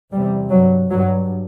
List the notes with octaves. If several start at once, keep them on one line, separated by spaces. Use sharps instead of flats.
E2 C3 G3
G2 F#3
G2 F#3